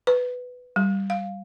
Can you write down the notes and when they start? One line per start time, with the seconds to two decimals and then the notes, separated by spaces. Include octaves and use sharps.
0.07 B4
0.76 G3
1.10 F5